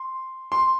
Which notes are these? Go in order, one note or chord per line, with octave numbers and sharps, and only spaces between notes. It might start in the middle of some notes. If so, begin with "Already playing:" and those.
Already playing: C6
C6